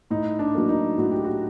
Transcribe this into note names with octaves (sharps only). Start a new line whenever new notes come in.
A2 D#4
D4
F#3 A#3
D#4
A2 F#4
G4
F#4